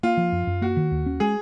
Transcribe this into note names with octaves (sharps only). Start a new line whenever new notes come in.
A#3 F4
F3
F#2
F#2
A#3 F#4
D#3
D#2
C#4
G#3 G#4